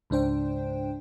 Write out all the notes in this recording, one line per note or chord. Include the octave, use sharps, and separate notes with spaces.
C#2 G#2 D4 C5 G5